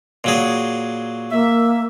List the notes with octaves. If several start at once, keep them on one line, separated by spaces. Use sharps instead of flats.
A#2 F#3 G#4
A#3 E5